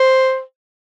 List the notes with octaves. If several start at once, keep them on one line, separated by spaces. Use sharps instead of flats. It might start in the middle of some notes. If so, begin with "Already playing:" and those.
Already playing: C5